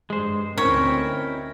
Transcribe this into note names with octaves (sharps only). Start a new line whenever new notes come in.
G2 G#3 C5
D2 C4 C#4 D#4 E4 A#4 C#5